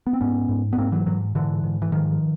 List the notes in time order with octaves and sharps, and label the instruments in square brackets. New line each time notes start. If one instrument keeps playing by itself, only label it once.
[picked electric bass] B3
C4
G#2 B3 C#4
G#2
B3
G#2 A#3 C4
E3 F#3
G#2 E3 F#3
G#2 D3 E3
G#2
E3
G#2 D#3 F3